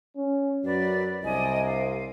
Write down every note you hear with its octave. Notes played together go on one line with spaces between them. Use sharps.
C#4
F#2 F#3 B4 D5
C2 C3 D4 D#5 G#5
F5